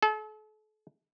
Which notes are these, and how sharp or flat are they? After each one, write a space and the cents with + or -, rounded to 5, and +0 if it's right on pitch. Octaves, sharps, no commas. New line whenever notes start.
A4 -40